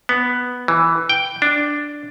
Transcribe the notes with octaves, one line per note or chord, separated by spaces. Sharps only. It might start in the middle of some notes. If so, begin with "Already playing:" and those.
B3
E3
G5
D4